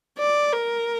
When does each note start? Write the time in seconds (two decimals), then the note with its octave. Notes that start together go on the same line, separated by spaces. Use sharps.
0.18 D5
0.52 A#4